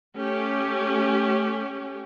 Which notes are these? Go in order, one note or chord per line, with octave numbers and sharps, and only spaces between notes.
A3 C#4 G4